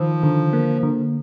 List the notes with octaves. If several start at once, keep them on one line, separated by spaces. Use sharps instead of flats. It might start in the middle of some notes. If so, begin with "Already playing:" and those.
Already playing: D#3 F3
D3
A#3
D3